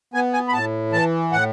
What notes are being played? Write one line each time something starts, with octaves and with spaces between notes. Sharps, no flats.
B3 G#5
G#5
B5
A2 A5
E3 A5
A2 F#5